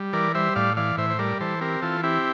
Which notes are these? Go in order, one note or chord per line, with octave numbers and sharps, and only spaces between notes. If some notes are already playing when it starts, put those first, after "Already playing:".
Already playing: G3
E3 A#4 D5
G3 C5 E5
A2 D5 F5
E3 D5 F5
A2 C5 E5
C5
G3 A#4 D5
E3 A4 C5
C4 G4 A#4
E3 F4 A4
C4 E4 G4